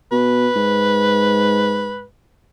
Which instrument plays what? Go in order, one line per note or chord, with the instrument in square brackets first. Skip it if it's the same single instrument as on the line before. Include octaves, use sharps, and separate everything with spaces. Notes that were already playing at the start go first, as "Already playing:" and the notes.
[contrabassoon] B2 [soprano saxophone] B4
[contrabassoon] G#2